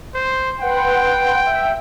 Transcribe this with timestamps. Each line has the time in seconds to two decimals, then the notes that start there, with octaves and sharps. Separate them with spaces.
0.15 C5
0.60 B4 F#5 G5 C6
1.46 E5